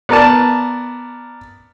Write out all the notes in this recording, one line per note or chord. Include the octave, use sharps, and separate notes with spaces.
B3 A#4 D5 A5